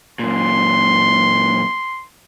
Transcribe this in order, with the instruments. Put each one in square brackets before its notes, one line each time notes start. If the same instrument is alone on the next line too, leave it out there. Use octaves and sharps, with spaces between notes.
[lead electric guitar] F#2 A#2 [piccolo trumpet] C6